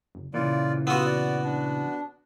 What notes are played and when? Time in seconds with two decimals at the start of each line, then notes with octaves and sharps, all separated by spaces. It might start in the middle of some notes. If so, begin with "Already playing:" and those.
0.15 F#1
0.34 A#2 C#3 E3 F4 D5
0.87 B3 F4 F#4 D#6 E6
1.06 D5
1.44 D4